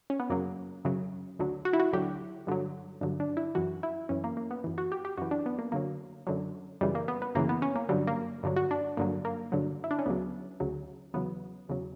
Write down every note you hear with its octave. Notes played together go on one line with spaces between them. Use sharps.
C#4
B3
F#2 C#3 F#3 A#3
F#2 C#3 F#3
D2 D3 F#3
F#4
E4
F#4
D2 D3 F#3 G4
G2 D3 F#3
G2 D3 F#3
D4
E4
F#2 E3 F#4
E4
F#2 E3 C#4
A#3
A#3
B3
F#2 E3
F#4
G4
G4
F#2 E3 F#4
D4
B3
A#3
F#2 D3 F#3 A#3
F#2 D3 F#3
F#2 C#3 E3 G3
A#3
B3
B3
F#2 C#3 E3 A#3
B3
C#4
A#3
G2 D3 F#3 G3
A#3
G2 D3 F#3
F#4
D4
G2 D3 F#3 A#3
A#3
G2 D3 F#3
E4
D4
C#4
D2 C#3 F#3 B3
D2 C#3 F#3
E2 C#3 F#3 B3
E2 C#3 F#3